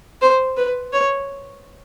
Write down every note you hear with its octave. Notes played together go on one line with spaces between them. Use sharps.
C5
B4
C#5